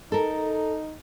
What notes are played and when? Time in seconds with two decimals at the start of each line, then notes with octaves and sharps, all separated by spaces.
0.12 D#4 A4 A#4